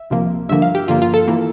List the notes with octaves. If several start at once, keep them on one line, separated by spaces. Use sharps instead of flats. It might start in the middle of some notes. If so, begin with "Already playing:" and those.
Already playing: E5
C2 C3 F3 A#3
G2 D3 F3 A#3 E5
F5
G4
G2 D3 F3 A#3 F4
F4
A4
E3 A#3